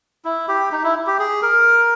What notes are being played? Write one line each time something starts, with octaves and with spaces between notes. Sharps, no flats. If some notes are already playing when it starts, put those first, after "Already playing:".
E4
G4
D#4
E4
G4
G#4
A#4